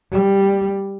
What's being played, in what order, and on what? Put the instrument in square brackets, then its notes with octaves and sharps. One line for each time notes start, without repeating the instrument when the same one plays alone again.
[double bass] G3